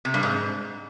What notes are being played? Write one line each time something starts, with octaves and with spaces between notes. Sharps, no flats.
C3
G2
G#2